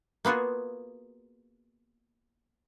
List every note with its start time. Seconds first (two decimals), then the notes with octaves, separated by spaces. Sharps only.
0.25 A#3 B3 F4 F#4 G#4